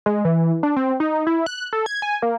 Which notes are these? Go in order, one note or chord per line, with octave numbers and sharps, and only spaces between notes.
G#3
E3
D4
C4
D#4
E4
F#6
A4
G#6
G#5
A#3